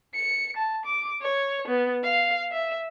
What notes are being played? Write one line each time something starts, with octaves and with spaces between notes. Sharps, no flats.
C#7
A5
D6
C#5
B3
F5
E5